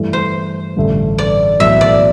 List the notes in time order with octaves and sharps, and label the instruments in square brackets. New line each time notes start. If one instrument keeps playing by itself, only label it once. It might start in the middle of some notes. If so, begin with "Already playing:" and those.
Already playing: [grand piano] G2 E3 A3
[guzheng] C5
[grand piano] A1 G2 D3 A3
[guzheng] D5
[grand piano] B1 A2 E3 [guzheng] E5
[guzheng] D5